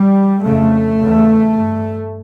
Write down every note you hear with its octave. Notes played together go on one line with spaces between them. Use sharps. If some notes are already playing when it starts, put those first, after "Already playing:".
Already playing: G3
F2 C#3 A3
E2 C#3
G2